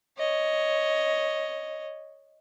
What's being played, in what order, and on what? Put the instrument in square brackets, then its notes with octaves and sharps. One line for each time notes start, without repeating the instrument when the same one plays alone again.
[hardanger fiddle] C#5 D#5